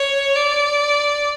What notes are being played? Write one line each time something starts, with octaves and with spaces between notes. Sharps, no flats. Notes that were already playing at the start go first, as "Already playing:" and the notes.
Already playing: C#5
D5